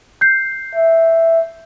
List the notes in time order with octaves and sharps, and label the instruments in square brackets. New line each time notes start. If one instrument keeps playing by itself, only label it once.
[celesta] G6 C7
[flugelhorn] E5